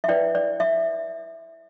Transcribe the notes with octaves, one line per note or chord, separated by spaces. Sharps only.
E5
E4 B4 D5 G5
D5
E5